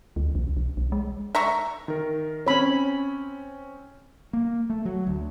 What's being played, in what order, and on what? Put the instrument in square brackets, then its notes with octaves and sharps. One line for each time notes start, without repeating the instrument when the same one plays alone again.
[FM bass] D2
B1
B1
B1
G#3
[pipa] E5 A#5 C#6
[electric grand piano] D#3 A#4
[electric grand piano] C4 C#4 [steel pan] C#5 B5
[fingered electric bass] A#3
A3
F#3
D2